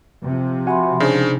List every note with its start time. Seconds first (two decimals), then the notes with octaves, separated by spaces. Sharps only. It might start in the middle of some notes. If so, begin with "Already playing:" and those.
0.24 C3 F3
0.67 F#4 E5 F#5 G#5 B5 C6
1.00 C#3 D4 D#4 G#4 C5